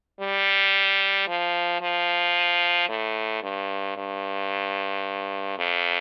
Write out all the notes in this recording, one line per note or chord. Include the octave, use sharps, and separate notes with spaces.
G3
F3
F3
A2
G2
G2
F2